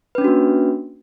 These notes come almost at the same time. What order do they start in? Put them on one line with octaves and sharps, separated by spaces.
B4 C#4 D4 F#4 A#3